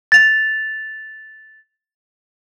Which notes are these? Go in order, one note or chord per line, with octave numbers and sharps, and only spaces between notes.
A6 F7